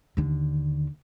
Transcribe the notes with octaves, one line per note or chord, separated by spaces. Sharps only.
D#2 D3